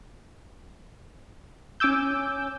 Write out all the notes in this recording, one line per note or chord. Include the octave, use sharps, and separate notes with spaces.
C#4 G#5 D6 E6 G6